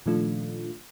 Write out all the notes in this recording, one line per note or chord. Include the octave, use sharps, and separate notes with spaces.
A#2 D#3 F3 A3 D4 F4